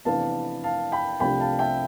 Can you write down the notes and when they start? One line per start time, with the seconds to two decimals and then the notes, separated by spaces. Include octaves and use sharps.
0.05 F1 F2 E3 B3 D4 F5 A5
0.64 F5 A5
0.92 G5 B5
1.20 C2 C3 F3 A3 D4 G5 B5
1.40 F5 A5
1.59 E5 G5